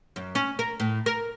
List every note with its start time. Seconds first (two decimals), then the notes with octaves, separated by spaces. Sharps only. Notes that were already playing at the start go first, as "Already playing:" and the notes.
0.16 F#2
0.35 C#4
0.59 A#4
0.80 A2
1.06 A#4